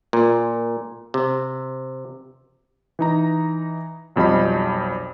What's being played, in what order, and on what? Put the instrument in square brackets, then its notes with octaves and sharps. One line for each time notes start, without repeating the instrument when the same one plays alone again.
[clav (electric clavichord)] A#2
C3
[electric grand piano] E3 D#4 A#5
B1 F2 G3 D#5 B5